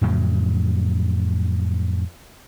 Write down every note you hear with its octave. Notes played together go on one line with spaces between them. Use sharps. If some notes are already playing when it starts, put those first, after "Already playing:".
F2 A2 C#3 F#3